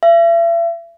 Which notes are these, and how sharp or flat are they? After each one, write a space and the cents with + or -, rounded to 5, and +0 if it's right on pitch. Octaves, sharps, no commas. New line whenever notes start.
E5 +40